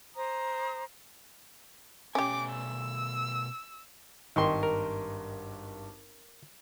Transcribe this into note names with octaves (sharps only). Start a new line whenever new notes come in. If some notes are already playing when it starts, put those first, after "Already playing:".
C5 A#5 D#6
B2 A3 C#4 G4 G#5 D6
E6
G#1 G2 D#3 C6 C#6
A#4